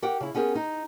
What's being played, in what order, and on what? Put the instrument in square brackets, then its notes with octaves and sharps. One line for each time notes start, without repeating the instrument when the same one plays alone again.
[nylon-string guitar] G4 A#4 F#5 G5
C#3 E4
B3 C#4 G4 G#4 A#4
D#4